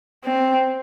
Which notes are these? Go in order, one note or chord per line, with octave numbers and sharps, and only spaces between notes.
C4